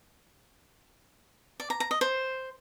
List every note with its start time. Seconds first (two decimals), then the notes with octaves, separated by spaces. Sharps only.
1.60 D5
1.70 A#5
1.80 A#5
1.91 D#5
2.01 C5